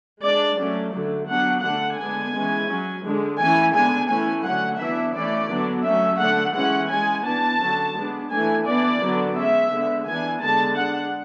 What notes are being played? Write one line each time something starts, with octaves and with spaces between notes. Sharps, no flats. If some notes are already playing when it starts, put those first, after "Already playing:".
G#3 D4 D5
F#3 A3 C#4
D3 F#3 A3
F#3 B3 D4 F#5
D3 A3 D4 F#5
D3 G#3 B3 D4 G#5
E3 G#3 C#4
F#3 C#4
D3 G#3 D4
E3 A3 C#4 G#5
D3 G#3 B3 D4 G#5
E3 A3 C#4 G#5
D3 F#3 A3 C#4 F#5
E3 B3 D4 E5
E3 A3 C#4 D5
D3 F#3 B3 D4
F#3 A3 C#4 E5
D3 A3 D4 F#5
E3 G#3 C#4 F#5
G#3 C#4 G#5
E3 B3 D4 A5
D3 F#3 C#4
G#3 B3 D4
E3 A3 D4 G#5
E3 B3 D4 D5
D3 F#3 B3 D4
G#3 C#4 E5
D3 G#3 B3
E3 B3 D4 G#5
D3 G#3 B3 D4 A5
G#3 D4 F#5